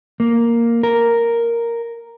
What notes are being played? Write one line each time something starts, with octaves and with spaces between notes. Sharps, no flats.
A#3
A#4